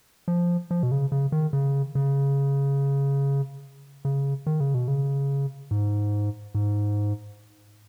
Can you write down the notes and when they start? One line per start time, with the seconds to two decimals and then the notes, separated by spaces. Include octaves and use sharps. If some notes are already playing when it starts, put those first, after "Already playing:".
0.28 F3
0.71 F3
0.83 B2
0.91 C#3
1.12 C#3
1.32 D#3
1.53 C#3
1.95 C#3
4.05 C#3
4.46 D#3
4.60 C#3
4.74 B2
4.88 C#3
5.71 G#2
6.55 G#2